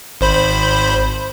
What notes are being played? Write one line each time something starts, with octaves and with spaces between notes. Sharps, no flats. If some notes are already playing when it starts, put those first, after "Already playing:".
G#1 C5 B5